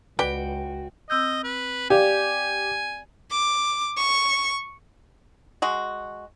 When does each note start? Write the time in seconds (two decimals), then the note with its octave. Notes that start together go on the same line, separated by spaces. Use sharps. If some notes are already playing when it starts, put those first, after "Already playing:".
0.19 C#2 F#4 B4 D5 G5
1.10 C4 D#5 E6 G6
1.44 B4
1.90 G4 D5 F5 G#5
3.31 D6
3.97 C#6
5.62 G#3 F#4